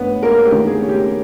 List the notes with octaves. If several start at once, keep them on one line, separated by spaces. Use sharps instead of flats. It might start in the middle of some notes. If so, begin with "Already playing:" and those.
Already playing: G2 B3 C#4 B4
G#3 A#3 A#4
G4
D#3
G#4
C#4
G4